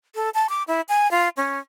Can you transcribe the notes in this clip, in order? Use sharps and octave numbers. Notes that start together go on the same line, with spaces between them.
A4
A5
D6
E4
G#5
F4
C#4